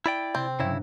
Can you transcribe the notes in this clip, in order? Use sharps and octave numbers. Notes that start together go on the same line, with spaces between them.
E4 D5 G5
C3 C4
G2 C#3 F#3 E4